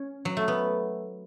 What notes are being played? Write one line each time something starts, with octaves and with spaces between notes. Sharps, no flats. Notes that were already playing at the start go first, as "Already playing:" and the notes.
Already playing: C#4
F#3
A3
B3